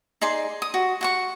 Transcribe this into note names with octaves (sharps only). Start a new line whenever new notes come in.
D#4 G#4 D5 C6
D#6
F#4
F#4 F#5 C#6